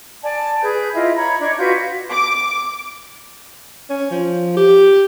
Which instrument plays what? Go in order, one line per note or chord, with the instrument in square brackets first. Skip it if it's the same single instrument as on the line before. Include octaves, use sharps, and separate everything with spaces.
[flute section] D5 G#5 A5
G#4 B4 G6
E4 F4 D#5 E5
C#5 A#5 B5
D4 C#5 D#5
F4 F#4 B4 G6
[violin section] D6
[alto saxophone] C#4
F3
G4